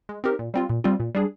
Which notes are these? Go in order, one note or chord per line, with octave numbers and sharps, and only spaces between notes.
G#3
C4 D#4 G4 A#4
A#2
G3 C4 F4
A#2
G3 C4 F4
A#2
G3 D4 G#4